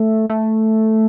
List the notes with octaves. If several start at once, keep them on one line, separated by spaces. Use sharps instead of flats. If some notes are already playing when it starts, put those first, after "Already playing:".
Already playing: A3
A3